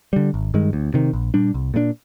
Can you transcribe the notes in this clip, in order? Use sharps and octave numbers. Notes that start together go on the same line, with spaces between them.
D3 G3
G#1
G2 D#3 G#3
D2
C3 D#3
A#1
A#2 G3 D4
C2
A#2 G3 D4